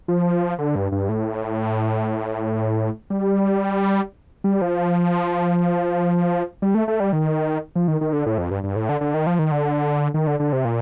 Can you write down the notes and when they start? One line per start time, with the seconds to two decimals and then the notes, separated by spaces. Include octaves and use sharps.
0.08 F3
0.59 D3
0.75 G2
0.92 G2
1.09 A2
3.10 G3
4.44 G3
4.62 F3
6.62 G3
6.75 A3
6.88 A3
7.00 G3
7.13 D#3
7.76 F3
7.88 D#3
8.01 D#3
8.13 D3
8.26 A2
8.38 F2
8.51 G2
8.64 G2
8.76 A2
8.89 D3
9.01 D3
9.14 D#3
9.27 F3
9.39 D#3
9.52 D3
10.14 D#3
10.27 D3
10.40 D3
10.53 C3
10.65 A#2